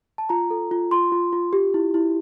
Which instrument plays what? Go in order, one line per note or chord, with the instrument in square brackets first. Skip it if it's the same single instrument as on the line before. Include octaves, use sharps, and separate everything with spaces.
[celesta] A5
F4 A#5
A4
F4
F4 C6
F4
F4
G4
E4
E4